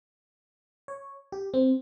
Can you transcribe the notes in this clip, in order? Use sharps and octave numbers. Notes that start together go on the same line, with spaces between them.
C#5
G4
C4